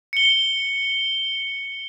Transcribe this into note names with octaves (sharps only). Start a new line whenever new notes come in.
C#7 G7